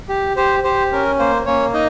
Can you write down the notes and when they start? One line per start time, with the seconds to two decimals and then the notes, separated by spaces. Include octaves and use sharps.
0.09 G4
0.36 G4 C5
0.64 G4 C5
0.92 C#4 A#4
1.19 A#3 C5
1.46 A#3 C#4 C#5
1.73 D#4 D#5